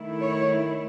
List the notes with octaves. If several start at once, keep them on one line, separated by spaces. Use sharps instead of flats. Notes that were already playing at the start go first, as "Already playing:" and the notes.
Already playing: D#3 A3 E4
C#5